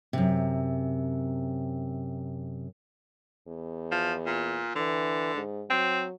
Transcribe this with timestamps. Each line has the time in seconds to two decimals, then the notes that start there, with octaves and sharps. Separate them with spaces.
0.13 F#2 C3
3.48 E2
3.91 F3
4.26 A#2
4.75 D3 E3
5.34 G#2
5.70 F#3 C4